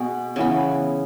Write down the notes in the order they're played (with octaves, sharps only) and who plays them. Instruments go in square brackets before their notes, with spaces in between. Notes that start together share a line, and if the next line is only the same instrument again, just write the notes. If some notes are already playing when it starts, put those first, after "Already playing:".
Already playing: [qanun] B2 B3 G#4
C#3 E3 B3